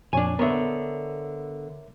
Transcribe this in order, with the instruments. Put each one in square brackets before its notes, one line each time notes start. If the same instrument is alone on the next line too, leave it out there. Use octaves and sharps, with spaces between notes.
[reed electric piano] F2 A#2 C#5 [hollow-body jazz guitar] D4 G#5
[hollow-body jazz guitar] D3 B3 [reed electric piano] A#4 C#5 E5